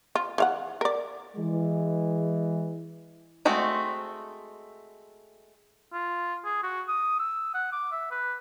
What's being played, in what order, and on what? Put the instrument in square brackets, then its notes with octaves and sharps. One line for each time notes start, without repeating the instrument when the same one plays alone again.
[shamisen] F4
E3 F5 F#5
A#4 D5
[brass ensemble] E3 G#3
[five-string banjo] G#3 A3 C4 F#4
[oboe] F4
G#4
F#4
D#6
E6
F#5
D6
E5
B4